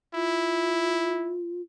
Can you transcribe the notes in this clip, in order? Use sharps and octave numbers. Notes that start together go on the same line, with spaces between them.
E4 F4